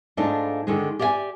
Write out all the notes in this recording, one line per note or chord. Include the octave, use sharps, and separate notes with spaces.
G#2 A3 D4 D#4 F4
D3 D#3 G#3
G4 D5 E5 F5 G#5